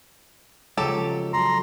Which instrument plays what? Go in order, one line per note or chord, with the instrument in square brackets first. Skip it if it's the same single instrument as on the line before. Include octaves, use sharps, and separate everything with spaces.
[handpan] C#3 F3 G#3 [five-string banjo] F#3 G4 A4
[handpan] F#3 F#4 A4 [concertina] A#5 C6